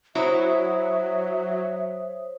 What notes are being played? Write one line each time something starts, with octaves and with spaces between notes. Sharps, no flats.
F#3 E4 C5 C#5 E5 D#6